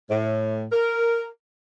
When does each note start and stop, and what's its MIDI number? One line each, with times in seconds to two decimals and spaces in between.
0.10 0.66 45
0.72 1.26 70